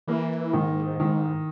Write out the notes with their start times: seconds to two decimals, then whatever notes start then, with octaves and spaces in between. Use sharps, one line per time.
0.07 E3 A#3
0.53 G#2 D#3
1.00 G#2 D#3